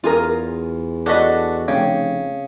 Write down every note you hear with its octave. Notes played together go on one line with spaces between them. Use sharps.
E2 F4 G#4 A#4
D4 F#4 A4 D#5 B5
F1 C#3 G5